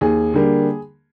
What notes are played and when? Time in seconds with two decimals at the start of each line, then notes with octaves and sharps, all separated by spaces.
0.01 D#2 G#4
0.34 D3 G3 A#3